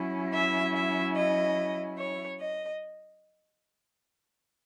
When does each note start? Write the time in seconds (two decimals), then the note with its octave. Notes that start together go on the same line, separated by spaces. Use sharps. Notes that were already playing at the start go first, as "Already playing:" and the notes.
Already playing: F#3 C#4 E4
0.32 E5
0.73 E5
1.15 D#5
1.97 C#5
2.40 D#5